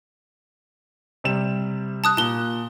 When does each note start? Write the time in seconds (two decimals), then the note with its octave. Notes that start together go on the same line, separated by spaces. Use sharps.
1.24 C3 G3 E7
2.04 A5 D#6 F#6
2.17 A#2 A5 G7